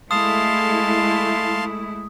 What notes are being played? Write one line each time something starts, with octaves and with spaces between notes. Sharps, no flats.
G#3 A3 E4 F5 A5 C6 D#6